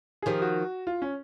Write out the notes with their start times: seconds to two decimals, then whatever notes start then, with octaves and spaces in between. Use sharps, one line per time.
0.22 G#4
0.26 D#3 F3 G4
0.42 F#4
0.87 F4
1.02 C#4